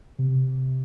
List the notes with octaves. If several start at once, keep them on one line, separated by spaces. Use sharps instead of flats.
C3